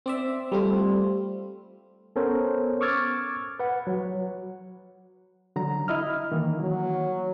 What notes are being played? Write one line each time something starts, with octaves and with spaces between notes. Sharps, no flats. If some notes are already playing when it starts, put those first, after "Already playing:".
C4 D5 E5
G3 A3 C4 F4
B3 C#4 A4 A#4 C5 C#5
C#6 D6 E6 F6 G#6 A6
B4 F#5
F#3
D3 F#3 A#5
E4 D#5 F6
D#3 E3 A#3
F#3